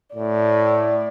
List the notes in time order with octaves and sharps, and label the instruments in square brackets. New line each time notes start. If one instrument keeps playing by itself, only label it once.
[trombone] A2 [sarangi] D5